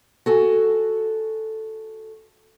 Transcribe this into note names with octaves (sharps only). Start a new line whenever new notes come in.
F#4 A4 G#5